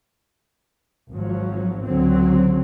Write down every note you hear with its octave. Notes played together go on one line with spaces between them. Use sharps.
G#1 F3 F#3
C#2 D3 F#3 C4